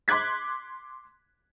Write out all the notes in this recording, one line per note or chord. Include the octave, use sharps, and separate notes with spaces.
C6 D6 F#6 G#6 B6